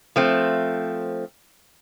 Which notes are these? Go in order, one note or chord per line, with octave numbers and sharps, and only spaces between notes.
F3 A3 C4